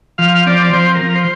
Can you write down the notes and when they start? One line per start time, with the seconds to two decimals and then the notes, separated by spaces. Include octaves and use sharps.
0.18 F3 F5
0.46 C4 D5
0.73 F3 C5
0.95 A#4
1.01 F3
1.15 C5